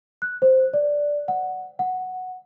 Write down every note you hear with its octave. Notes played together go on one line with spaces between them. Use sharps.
F#6
C5
D5
F#5
F#5